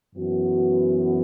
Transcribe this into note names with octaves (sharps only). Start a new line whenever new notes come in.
F#2 E3 B3 F#4